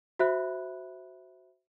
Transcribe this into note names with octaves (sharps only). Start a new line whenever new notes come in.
F#4 C5 E5 B5 F#6